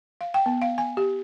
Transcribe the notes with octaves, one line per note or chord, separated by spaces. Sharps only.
F5
G5
B3
F5
G#5
G4